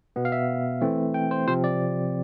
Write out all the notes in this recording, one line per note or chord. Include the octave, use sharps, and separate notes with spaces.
B2 B3
F5
E5
E3 A3 C4
G5
C5
C3 F3 C4 C5
D5